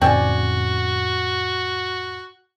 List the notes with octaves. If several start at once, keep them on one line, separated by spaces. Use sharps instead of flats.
F2 A2 C#3 C4 F#4 D5 G#5